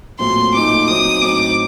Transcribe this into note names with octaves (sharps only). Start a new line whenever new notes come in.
A#2 F#3 A3 C4 C6
A#2 F#3 A3 D#4 D6
F#3 C4 D#4 D#6
A2 F#3 C4 D#4 D6